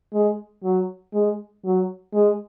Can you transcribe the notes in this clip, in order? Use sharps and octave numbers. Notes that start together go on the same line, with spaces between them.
G#3
F#3
G#3
F#3
G#3